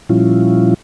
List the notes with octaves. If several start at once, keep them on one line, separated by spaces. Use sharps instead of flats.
A#2 F3 G3 C#4 E4 F4